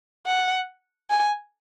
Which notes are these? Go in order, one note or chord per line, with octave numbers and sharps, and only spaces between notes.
F#5
G#5